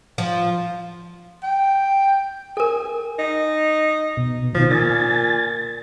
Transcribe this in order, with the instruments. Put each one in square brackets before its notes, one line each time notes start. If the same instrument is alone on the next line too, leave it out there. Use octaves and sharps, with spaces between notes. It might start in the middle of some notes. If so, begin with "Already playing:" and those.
[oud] F3
[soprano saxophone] G5
[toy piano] A4 A#4 [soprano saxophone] G#5
[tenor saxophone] D#4
[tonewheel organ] B2
[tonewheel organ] B2 D#3 [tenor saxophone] F3
[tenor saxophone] A#2 [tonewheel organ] G#5 A6